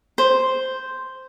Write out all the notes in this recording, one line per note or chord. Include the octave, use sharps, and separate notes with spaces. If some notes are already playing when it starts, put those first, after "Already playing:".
C5